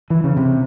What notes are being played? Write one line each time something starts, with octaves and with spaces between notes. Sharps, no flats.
E3
C#3
C3